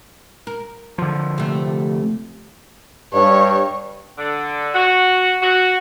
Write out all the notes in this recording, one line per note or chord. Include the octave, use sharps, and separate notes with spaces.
A#4
D3 F3
C3 A3
G2 C#5
D3
F#4
F#4